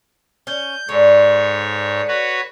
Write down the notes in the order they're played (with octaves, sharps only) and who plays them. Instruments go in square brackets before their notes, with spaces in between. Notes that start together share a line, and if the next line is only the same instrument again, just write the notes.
[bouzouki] C#4 [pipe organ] G6
[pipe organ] G#2 C#5 [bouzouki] D3
[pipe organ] F#4 B4 C#5